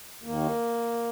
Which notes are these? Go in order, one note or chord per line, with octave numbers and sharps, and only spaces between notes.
D#2 D#3 A#3